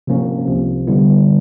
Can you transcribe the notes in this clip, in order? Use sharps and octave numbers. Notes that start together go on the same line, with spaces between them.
C3 F3 A#3 C#4
C2 C3 F3
D3 G3 B3 E4